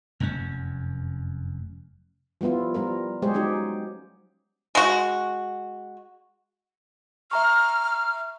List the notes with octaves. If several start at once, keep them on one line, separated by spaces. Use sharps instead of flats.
F1 F#2 C#4
F3 G3 B3 E4 F4
G3 F4 A#4
F#3 G#3 G4 G#4 C5 C#5
F#3 C#4 D#4 G4
G#3 F#4
E5 A#5 C#6 F6